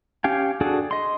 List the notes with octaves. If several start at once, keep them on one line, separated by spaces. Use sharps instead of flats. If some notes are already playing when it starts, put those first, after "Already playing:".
C#4 G4 F5 G5 G#5
D4 F#4 G#4 A4
D#5 C6